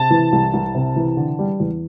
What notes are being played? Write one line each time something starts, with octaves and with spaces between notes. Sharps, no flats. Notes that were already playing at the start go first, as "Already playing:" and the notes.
Already playing: C3 A5
E3
C2
C2
C3
E3
D3
G3
E2